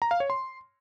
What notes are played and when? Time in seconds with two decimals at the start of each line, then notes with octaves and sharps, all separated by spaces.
0.02 A#5
0.11 F5
0.20 C#5
0.30 C6